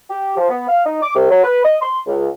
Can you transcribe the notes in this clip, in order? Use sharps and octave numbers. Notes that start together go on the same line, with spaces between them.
G4
F3
B3
F5
D#4
D6
C2
F#3
B4
D#5
C6
C#2